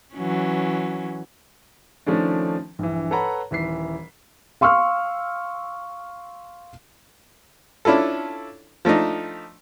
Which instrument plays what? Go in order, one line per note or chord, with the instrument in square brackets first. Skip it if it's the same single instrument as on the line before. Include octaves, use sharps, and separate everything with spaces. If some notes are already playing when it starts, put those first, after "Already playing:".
[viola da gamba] E3 F#3 C#4
[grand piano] D#3 F3 A3 C#4 D4
A#1 G2 E3
A4 B4 C#5 F#5 A#5 B5
D#1 E3 B6 C7
[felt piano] F5 C6 C#6 E6 F6
[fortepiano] C#4 D4 E4 F4 A4
F3 A3 D4 D#4